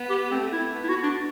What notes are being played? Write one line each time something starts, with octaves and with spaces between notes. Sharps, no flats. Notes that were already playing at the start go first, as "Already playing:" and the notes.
Already playing: B3
G4
A3 C4
E4
B3
E4
F#4
B3
D4